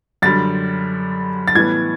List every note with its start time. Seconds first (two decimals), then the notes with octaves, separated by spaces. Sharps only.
0.22 F#2 D3 G3 A6
1.48 A6
1.55 A2 E3 G3 B3 G#6